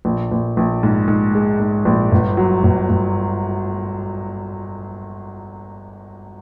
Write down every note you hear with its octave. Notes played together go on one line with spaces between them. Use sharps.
A#1
A#1
A#1
G#2
G#2
G#3
G#2
A#1
G1
F#3
G1
G1